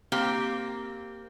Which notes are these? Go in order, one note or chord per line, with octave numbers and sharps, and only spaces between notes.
A#3 C4 G4